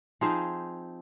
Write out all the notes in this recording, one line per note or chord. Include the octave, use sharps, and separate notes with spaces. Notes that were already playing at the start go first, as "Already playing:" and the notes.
F3 C4 D#4 G#4 C5